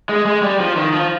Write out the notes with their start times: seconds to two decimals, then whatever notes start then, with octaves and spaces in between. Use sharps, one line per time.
0.09 G#3
0.26 G#3
0.43 G3
0.60 F3
0.76 D#3
0.93 F3